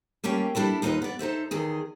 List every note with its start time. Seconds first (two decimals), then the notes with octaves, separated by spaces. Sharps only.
0.24 G3 A3 A#3 C#4 G5
0.55 G3 D4 E4 A4
0.82 D#2 D#4 F4 A4 B4 D#5
1.02 B3 D5
1.19 D#4 A4 C5 E5
1.51 E2 D#3 G#4